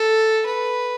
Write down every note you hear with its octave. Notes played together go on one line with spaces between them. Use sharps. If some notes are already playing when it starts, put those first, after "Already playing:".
Already playing: A4
B4